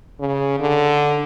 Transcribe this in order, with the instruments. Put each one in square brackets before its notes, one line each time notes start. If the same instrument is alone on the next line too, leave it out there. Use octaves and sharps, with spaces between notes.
[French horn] C#3
D3